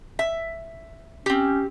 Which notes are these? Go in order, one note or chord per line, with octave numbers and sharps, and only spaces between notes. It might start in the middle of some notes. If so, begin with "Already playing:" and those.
E5
C4 C#4 G4